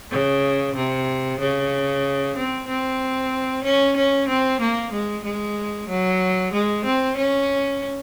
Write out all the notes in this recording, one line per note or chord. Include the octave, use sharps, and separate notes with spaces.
C#3
C3
C#3
C4
C4
C#4
C#4
C4
A#3
G#3
G#3
F#3
G#3
C4
C#4